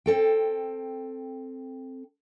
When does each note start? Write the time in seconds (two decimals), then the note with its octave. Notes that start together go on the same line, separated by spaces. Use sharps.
0.06 C4 A4 G5